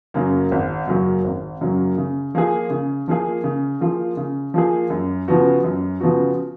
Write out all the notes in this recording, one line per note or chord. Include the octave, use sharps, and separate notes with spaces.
F#2 C#3 F#3 A#3
G#1
F#2 C#3 F#3 A#3
G#1
F#2 C#3 F#3 A#3
C#3
F3 A#3 F4 G#4
C#3
F3 A#3 F4 G#4
C#3
F3 A#3 F4 G#4
C#3
F3 A#3 F4 G#4
F#2
C#3 F3 B3 F#4
F#2
C#3 F3 B3 F#4